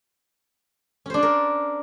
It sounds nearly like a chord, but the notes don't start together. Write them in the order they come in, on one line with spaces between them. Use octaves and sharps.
C#4 C5 D4 D5 A#4